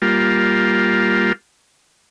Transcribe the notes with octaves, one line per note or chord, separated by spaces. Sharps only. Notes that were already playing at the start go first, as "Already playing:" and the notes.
G3 A#3 F4